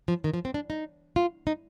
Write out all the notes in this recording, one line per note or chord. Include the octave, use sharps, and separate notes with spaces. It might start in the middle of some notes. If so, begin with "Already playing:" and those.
F3
D#3
F3
C4
D4
D#4
F4
D#4